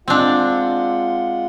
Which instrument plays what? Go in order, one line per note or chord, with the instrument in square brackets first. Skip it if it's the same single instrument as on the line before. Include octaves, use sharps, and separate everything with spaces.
[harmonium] G#3 F4 F#5 [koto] C4 D4